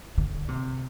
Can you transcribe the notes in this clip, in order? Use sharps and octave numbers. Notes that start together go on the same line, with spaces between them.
D3
C3